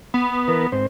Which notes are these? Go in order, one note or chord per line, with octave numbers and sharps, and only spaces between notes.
B3
E3 A#4 B4
G#2 C4 C5